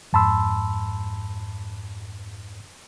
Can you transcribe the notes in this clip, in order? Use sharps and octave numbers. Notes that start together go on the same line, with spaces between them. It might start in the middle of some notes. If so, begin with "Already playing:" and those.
F2 G#2 A5 B5 C6 E6